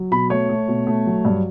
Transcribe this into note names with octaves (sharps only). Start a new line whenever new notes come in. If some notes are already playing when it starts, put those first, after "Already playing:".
Already playing: F#3
B2 B5
A3 C#5
A3
B2
A3
F#3
G2